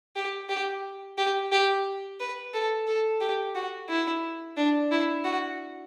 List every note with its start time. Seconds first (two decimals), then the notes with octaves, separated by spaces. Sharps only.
0.16 G4
0.49 G4
1.18 G4
1.52 G4
2.20 B4
2.54 A4
2.87 A4
3.20 G4
3.55 F#4
3.88 E4
4.57 D4
4.91 E4
5.24 F#4